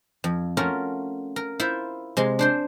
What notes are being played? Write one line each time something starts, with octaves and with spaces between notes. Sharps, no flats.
F2
A3 C#4 F4 F#4 A#4
A#4
E4 F4 C5 E5
C3 G#3 C6
D4 C5 C6